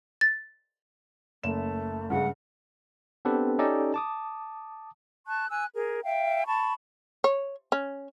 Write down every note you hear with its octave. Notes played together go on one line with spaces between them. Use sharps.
A6
F#1 A3 E7
G2 C#3 G#3 F#5
B3 C4 D4 G4 A4 B4
C#4 D#4 G4 A4 D5 D#5
A5 D6 D#6
A5 C#6 F#6
G#5 E6 F#6
G#4 A#4
E5 F5 G5
A5 B5 C#6
C#5
C#4